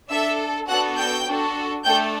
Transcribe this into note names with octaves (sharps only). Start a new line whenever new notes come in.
D4 A4 E5 E6
B3 D4 F#4 A4 F#5 F#6
G5 G6
D4 F#4 A4
A3 D4 A4 G5 G6